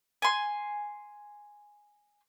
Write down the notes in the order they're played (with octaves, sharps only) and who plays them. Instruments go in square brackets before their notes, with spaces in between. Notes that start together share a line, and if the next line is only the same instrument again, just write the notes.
[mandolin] G#5 C6